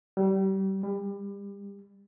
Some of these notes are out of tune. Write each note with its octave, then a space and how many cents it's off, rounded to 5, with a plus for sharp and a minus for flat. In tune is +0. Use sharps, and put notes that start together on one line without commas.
G3 -30
G3 +30